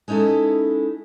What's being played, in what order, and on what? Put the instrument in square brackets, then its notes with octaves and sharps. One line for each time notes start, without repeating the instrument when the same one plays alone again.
[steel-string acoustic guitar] G#3 C#4 D#4 E4 A4